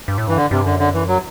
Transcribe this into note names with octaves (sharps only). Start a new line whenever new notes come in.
G2
A2
G2 E3
D3
G2 C3
F#2 D3
D3
E3
F#3